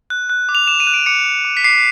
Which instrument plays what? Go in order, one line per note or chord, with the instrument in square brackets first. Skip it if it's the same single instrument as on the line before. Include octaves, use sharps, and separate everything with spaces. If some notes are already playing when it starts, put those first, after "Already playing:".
[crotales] F#6
F#6
D6
F7
D6 E7
D#7
F#6
D7
D6 C#7
D6
D6
B6
D6 C7